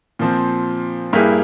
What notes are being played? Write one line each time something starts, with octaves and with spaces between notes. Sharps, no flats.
A#2 F3 C4
G2 G3 A#3 E4 G#4